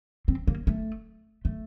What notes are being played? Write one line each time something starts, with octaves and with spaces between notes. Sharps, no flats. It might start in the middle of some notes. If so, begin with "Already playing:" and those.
C4
A#3
A3
A3